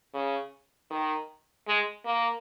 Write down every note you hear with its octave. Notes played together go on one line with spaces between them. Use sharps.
C#3
D#3
G#3
A#3